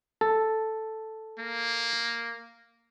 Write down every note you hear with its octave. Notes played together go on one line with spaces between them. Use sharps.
A4
A#3